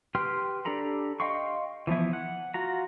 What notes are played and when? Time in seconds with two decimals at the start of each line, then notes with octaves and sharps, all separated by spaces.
0.15 G4 B4 G5 C6 F6
0.65 D4 G4 A4 A#5 B5
1.20 D#5 F5 G5 C6 C#6
1.87 E3 F3 B3 E4
2.13 F#5
2.54 F4 F#4 A#5